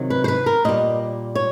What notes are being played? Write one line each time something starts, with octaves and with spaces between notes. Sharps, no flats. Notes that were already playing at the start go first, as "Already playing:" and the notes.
Already playing: C3 D#3 F#3
B4
C5
B4
A#4
A#2 G3 D#5
C#5